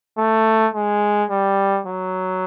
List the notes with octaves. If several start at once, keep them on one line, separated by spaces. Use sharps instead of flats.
A3
G#3
G3
F#3